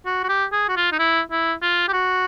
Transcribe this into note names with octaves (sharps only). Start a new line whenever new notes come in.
F#4
F#4
G4
G#4
F#4
F4
D#4
E4
E4
F4
G4
F#4